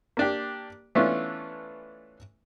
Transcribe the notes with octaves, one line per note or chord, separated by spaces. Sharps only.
A#3 D4 G4
E3 A3 B3 C#4 D4 F4